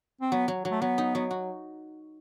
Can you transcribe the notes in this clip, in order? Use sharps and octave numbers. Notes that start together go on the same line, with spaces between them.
C4
F#3 B3
F#3
F#3
A3
F#3 B3
D#4
F#3
F#4